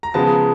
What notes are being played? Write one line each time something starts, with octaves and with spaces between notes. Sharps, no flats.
A#5
C#3 F3 G#3 B3 A5